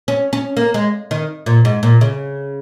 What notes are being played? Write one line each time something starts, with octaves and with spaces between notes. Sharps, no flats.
C#4
C#4
A#3
G#3
D#3
A#2
G#2
A#2
C#3